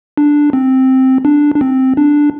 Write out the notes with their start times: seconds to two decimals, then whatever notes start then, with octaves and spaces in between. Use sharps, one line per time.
0.18 D4
0.53 C4
1.25 D4
1.55 D4
1.61 C4
1.97 D4